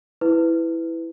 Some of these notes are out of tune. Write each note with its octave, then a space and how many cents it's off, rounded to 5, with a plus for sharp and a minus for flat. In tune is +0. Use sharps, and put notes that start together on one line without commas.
E4 +0 B4 +15